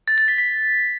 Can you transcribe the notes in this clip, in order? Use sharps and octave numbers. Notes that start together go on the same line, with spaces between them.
A6
A6
B6
B6